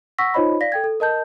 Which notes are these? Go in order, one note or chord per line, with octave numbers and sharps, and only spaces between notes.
F#5 C#6 E6 A#6 B6
D#4 F4 C5 C#5 D#5 B5
D5 F5 A#6 B6
A4 G5 G#6
A4
A#4 D#5 A5 G6